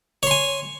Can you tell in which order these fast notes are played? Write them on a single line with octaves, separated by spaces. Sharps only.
C#5 C6 G#5